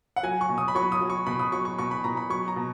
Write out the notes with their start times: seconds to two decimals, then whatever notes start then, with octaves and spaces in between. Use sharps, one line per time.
0.16 F#5
0.23 F#3 G#5
0.41 C#6
0.49 B2
0.58 D#6
0.68 B5
0.75 F#3 C#6
0.92 D#6
1.01 F#3
1.10 C#6
1.26 B2 B5
1.39 D#6
1.52 F#3 C#6
1.65 C#6
1.78 B2 C#6
1.91 B5
2.04 B2 A#5
2.17 B5
2.30 F#3 C#6
2.48 A#5
2.56 B2